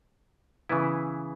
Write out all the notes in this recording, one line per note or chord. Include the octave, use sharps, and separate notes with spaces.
C#3 E3 B3 E4 B4